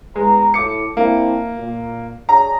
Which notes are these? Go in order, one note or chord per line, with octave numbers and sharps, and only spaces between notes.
E2 G#3 B4 A#5
A2 E4 A4 D6 C#7
A#3 C4 D4 E4
A#2
D4 G#4 C#5 A#5